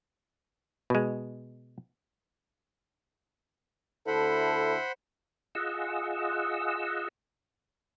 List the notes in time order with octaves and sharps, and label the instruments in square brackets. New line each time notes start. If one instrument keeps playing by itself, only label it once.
[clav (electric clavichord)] B2 G#3
[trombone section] D2 E4 A4 [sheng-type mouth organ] C5 F#5 B5
[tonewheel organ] F4 G#4 D#5 F#5 E6